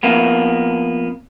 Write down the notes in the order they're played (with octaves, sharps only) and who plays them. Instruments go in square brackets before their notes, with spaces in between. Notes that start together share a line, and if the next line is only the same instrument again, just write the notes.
[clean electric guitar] F2 A#3 B3